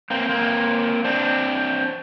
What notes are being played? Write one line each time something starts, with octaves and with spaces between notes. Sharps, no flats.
A#3 C4
A#3 C4
C4 D4